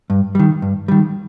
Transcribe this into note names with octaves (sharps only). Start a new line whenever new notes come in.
G2
D#3 G3
G2
D#3 G3